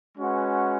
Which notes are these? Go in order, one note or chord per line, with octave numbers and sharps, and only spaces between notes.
G#3 C#4 F#4 B4 F#5